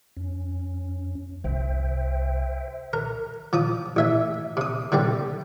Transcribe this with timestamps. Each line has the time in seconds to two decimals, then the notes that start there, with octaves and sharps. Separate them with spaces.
0.17 F2 C#4
1.44 C2 C5 E5 G5
2.93 A#4
3.53 F3 D6 D#6
3.96 A1 E5 G#5
4.57 C3 D#6
4.92 D3 G3 C4 G4